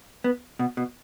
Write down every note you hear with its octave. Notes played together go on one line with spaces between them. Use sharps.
B3
B2
B2